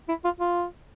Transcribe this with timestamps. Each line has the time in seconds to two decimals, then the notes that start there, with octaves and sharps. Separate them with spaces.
0.09 E4
0.25 F4
0.40 F4